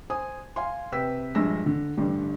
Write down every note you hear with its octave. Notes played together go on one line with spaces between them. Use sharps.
C5 G#5 D#6
F5 G#5 C6
C3 B4 G5 E6 B6
A#1 G2 G#3 E6 A#6
D3
A1 G2 D3 G3